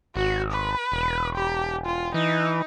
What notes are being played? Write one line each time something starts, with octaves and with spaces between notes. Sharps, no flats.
G#1 F#4
B4
E1
G4
F4
E3 D#4